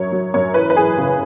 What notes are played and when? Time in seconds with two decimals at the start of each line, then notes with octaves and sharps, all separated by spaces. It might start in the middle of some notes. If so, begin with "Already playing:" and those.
Already playing: F#2 F#3 C#5
0.12 F#3
0.34 F#2 C#5
0.54 E3 B4
0.70 B4
0.76 E3 G#4
0.97 C#3